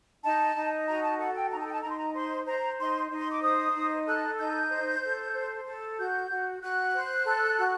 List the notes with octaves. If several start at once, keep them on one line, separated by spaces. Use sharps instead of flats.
D#4 A5
D#4
F#4 A#5
A5
A4 F#5
G5
D#4 A#5
A5
G5
A5
D#4 A#5
C6
A#5
C5 C6
C5 A#5
D#4 C6
D#4
C6
D6
C5 D#6
D#4
A4 F#6
D#4 G6
C5
A4
C5
A4
F#4 G6
F#4
F#4 F#6
C5
A4
F#4